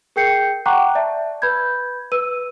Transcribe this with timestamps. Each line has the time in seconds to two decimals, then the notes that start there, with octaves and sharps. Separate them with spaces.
0.16 G#4 A#4 G5 G6 C7 C#7
0.66 F#5 G5 A#5 C#6 D6 F#6
0.95 D5 E5 A5
1.42 B4 B5 G6 G#6
2.12 B4 E6 D#7